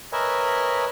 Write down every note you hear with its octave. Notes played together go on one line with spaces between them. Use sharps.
A#4 B4 C#5 D#5 E5 G#5